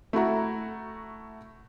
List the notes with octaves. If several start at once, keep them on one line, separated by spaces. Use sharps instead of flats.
A3 E4 F#4 A#5